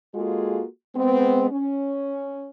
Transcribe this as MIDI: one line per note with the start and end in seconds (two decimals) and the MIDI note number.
0.15 0.64 56
0.15 0.64 58
0.15 0.64 65
0.15 0.64 66
0.15 0.64 68
0.15 0.64 69
0.95 1.47 56
0.95 1.47 59
0.95 1.47 60
1.50 2.50 61